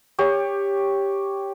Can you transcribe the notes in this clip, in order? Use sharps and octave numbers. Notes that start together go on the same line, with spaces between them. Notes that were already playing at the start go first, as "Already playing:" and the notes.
G4 C#5